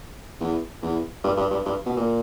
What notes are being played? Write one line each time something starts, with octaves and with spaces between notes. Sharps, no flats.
E2
E2
G2
G2
G2
G2
B2
A#2